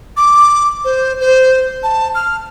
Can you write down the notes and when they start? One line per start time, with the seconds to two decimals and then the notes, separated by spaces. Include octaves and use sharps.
0.17 D6
0.85 C5
1.20 C5
1.83 A5
2.15 F6